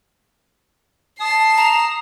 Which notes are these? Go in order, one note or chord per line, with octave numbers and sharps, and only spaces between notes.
A5 D#6 C7 E7
A#5